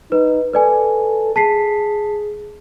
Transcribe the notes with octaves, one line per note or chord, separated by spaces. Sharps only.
D#4 B4
A4 B4 D5 G#5
G#4 A5 B6 C7